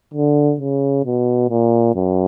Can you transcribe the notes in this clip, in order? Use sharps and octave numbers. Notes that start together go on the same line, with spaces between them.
D3
C#3
B2
A#2
F#2